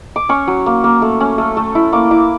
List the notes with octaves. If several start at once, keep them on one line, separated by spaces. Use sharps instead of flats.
D6
C#4 C#6
F#3
A#3
A#3
A3
C#4
A3
A3
E4
A#3 D6
E4 D6